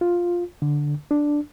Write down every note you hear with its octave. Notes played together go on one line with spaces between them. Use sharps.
F4
D3
D4